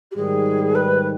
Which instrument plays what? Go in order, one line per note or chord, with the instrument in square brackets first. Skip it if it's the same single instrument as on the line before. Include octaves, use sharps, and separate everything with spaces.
[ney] G4
[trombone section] G#2 D#3 G3 [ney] G#4
[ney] B4